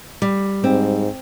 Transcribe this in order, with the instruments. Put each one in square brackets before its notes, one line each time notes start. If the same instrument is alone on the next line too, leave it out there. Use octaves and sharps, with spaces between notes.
[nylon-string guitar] G3
[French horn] G#2 [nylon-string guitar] C4